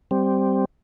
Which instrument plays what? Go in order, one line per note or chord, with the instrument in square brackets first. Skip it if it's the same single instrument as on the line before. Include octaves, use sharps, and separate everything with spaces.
[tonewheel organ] G3 C4